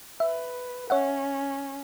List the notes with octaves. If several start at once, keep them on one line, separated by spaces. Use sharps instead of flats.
B4 E5
C#4 C#5 E5 F#5